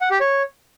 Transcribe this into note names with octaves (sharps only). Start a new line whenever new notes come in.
F#5
G4
C#5